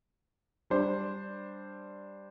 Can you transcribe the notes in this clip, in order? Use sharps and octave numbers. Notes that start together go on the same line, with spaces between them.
G3 D4 C5